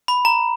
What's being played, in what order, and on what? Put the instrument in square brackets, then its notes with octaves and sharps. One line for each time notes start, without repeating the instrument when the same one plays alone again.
[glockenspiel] B5
A#5